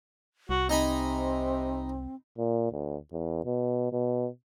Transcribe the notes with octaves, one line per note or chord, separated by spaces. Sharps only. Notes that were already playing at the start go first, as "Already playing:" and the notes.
C2 F#4
C3 C4 D#4 G#5 B5
A#2
D2
E2
B2
B2